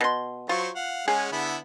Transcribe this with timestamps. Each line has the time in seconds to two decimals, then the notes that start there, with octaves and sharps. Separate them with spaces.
0.01 B2 C6
0.49 F#3 F4 C5 C#6
0.75 F5 F#5
1.08 G#3 C#4 G#4 F#5
1.32 D3 B3 E4